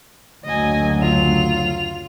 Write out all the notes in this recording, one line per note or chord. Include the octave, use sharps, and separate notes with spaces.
F#1 D2 F#3 D#5 G#5
F4 F7